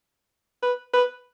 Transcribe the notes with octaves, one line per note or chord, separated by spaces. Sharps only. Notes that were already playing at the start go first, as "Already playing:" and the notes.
B4
B4